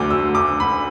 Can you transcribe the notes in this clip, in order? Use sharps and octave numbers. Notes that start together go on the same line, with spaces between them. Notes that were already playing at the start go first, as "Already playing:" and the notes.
Already playing: D2 D3 F#3 D6
E6
D6
B5